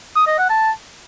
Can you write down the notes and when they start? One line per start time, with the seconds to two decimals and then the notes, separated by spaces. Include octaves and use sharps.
0.16 D#6
0.27 D#5
0.38 F#5
0.50 A5